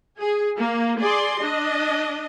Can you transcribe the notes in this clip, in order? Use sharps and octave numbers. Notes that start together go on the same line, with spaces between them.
G#4
A#3
G#4 D5 C6
D4 D#5